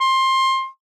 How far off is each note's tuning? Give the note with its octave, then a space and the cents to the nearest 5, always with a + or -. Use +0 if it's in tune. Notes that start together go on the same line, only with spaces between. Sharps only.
C6 +20